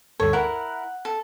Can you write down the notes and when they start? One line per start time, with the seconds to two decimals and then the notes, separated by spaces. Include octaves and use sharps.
0.20 D2 G2 A4 C#5
0.33 E4 A#4 F#5 F#6
1.05 A4